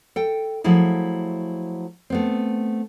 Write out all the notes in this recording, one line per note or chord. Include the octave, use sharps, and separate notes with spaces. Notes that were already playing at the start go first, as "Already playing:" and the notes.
A4 G5
F3 F#3 A3 E4 G#4
A3 B3 C4